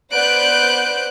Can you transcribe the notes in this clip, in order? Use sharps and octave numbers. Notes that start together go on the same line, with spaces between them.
B3 C5 D5 F#6 G6 D7